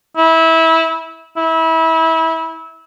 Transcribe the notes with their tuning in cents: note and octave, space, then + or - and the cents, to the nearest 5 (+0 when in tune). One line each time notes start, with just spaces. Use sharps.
E4 -20
E4 -25